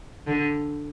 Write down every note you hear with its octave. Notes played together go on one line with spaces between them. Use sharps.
D3